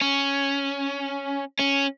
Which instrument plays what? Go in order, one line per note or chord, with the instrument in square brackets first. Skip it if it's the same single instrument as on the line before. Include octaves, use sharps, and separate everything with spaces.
[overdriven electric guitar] C#4
C#4